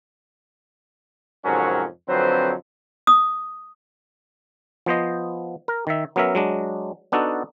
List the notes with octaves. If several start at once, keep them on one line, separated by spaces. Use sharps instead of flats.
F2 G#2 C3 F#3 C#4 A#4
F2 D3 F#3 C4 B4 C5
D#6
F3 B3 C5 D#5
A#4
D#3 E5
F#3 B3 C#4 A#4 E5
F#3 G#3 D4
B3 D4 D#4 F#4 A4